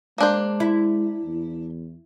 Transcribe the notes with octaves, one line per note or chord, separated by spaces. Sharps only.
G#3 A#3 D4 C5
E4
E2